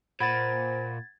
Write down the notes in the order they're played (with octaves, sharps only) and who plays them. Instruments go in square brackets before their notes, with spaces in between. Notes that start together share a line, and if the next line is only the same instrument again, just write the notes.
[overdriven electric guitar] A#2 [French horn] C5 [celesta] F#5 B5 [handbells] G#6 A6